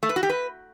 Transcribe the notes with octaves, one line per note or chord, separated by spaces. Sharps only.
A3
B4
F#4
G4
B4